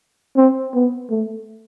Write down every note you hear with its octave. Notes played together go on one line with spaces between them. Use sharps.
C4
B3
A3